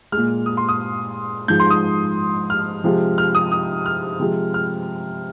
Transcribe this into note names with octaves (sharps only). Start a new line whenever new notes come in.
A#2 G#3 F6
D#6
C6
D#6
G#2 F3 G#3 G6
C6
D#6
F6
C3 F3 G#3
F6
D#6
D#6
F6
C3 F3 G#3
F6